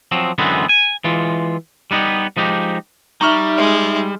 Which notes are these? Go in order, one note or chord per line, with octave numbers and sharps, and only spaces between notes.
F3 F#3 C4
F#2 D3 E3 G#3 B3 C4
G#5
E3 G#3 F4
G3 B3 D#4 G4
F3 G#3 D#4 G4
G3 D#4 E5 A#5 C#6 F6
G#3